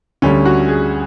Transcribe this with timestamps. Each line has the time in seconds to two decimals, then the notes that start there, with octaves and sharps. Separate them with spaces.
0.22 D2 D3 G3 C#4
0.45 F#4
0.68 G#4